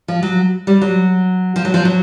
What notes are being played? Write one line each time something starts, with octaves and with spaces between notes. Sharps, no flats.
F3
F#3
G3
F#3
F3
F#3
F3
F#3